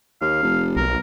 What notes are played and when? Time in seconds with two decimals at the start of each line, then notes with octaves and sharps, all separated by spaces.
0.21 D#2 F5
0.42 F1
0.77 B1 A#4